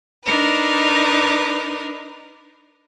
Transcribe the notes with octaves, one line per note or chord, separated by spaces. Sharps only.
D4 D#4 A#4 B4